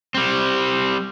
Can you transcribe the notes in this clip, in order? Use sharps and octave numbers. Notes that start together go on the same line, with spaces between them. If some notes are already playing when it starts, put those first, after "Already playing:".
G3 C4